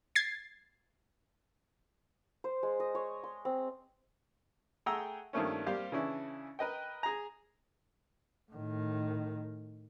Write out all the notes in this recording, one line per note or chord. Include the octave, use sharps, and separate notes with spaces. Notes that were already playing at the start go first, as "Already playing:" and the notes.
G#6 A6 C7
C5
G#3
D#5
C#5
C6
C4
A3 G#4 F#5 G5 A#5 E6
G2 D#3 F3 A3 A#3 C#4
G3 A#3 C4 G4 C5 F5
C#3 E3 C#4 D4 E4
A#4 B4 D#5 G5
G#4 A#5
A2 D#3